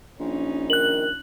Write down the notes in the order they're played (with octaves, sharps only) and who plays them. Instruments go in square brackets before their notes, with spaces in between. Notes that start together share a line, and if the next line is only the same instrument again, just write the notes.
[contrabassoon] A#1 [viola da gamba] C#4 D#4
[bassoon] D#3 [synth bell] F#6 F#7